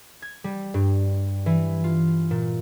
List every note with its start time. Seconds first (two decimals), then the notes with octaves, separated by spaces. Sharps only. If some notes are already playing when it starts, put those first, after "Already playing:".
0.22 G#6
0.44 G3
0.74 G2
1.46 E3
1.84 F4
2.31 A#2